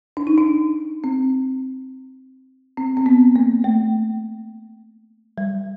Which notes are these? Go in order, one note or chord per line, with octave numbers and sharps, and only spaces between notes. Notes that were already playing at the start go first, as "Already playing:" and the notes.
D4
D#4
D4
C4
C4
C4
B3
A#3
A3
G3